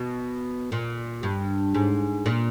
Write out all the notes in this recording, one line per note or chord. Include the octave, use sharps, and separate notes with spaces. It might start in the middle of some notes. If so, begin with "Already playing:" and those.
Already playing: B2
A#2
G2
G#2
A#2